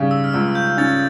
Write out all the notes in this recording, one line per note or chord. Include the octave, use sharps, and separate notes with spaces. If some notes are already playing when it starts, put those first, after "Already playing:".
Already playing: C#3 G3 C#4
E6
F6
C#2 E6
G6
C#4 A6